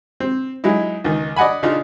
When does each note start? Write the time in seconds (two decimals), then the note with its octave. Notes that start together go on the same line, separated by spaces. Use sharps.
0.20 C4
0.64 F#3 G#3 D#4 E4
1.04 C#2 D#3
1.36 D5 D#5 F#5 G#5 B5
1.63 C#3 D4 D#4 F4